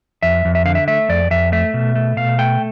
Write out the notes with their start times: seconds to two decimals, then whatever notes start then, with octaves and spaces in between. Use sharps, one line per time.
0.23 F2 E5
0.45 F2
0.55 E5
0.66 D3 F5
0.75 E5
0.88 A3 E5
1.09 F2 D5
1.31 F2 E5
1.52 A3 E5
1.74 B2
1.96 A3
2.17 B2 F5
2.38 A3 G5